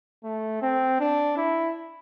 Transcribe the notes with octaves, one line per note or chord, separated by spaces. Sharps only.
A3
C4
D4
E4